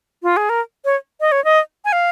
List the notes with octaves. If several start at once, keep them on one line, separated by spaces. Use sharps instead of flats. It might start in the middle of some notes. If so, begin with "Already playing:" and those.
F4
G#4
A#4
C#5
D#5
C#5
D#5
G#5
F5